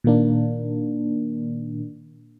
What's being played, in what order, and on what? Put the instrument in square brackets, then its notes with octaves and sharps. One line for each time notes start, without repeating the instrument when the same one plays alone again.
[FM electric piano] A#2 D#3 A#3 D4